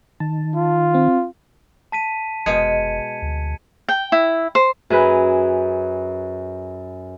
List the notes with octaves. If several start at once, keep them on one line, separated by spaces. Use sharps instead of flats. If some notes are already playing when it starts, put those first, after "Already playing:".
D#3 A5
F4
C4
A5 B6 D#7
F1 B2 G#3 G#6 C#7 D#7
D2
G5
E4
C5
F#2 G#4 B4